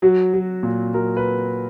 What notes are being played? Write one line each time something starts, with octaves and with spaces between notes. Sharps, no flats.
F#3 F#4
F#3
A#2
F#3 A#4
B4